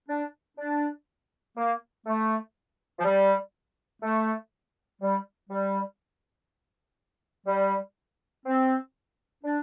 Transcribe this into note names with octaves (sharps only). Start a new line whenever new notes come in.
D4
D4
A#3
A3
F3
G3
A3
G3
G3
G3
C4
D4